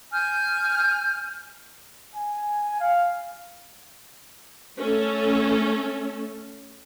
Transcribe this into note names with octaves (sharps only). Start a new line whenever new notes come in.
G#5 F6 G6
G#5
F5
A3 C#4 A4